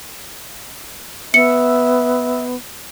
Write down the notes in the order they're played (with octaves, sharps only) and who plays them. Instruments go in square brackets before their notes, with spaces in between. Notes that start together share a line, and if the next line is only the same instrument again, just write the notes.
[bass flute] B3 [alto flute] E5 [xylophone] C#7